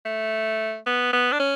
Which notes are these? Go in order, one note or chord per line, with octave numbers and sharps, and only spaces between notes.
A3
B3
B3
D4
C#4